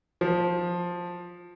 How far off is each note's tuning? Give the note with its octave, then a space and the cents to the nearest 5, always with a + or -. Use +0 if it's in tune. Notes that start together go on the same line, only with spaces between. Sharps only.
F3 +10 C5 +10